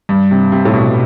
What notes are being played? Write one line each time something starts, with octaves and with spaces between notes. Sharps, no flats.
G2
C3
C3
A2
B2